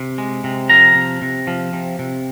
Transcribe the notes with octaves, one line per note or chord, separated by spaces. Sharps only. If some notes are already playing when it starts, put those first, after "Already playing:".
Already playing: C3
G#3
C3
F3 A#5
C3
C3
F3
C3
C3